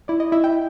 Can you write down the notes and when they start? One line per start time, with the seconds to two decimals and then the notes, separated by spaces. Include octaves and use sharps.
0.08 E4 D5
0.20 D#5
0.32 E4 E5
0.44 G5